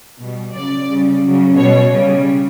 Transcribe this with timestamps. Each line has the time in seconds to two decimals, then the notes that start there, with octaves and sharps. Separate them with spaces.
0.19 B2 G3
0.53 C#3 F#3 D5
0.88 C#3 G3
1.22 C#3 F#3
1.56 B2 G3 C#5
1.92 C#3 G3